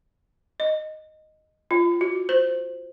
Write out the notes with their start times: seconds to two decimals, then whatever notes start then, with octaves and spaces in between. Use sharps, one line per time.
0.60 D#5
1.71 F4
2.01 F#4
2.29 C5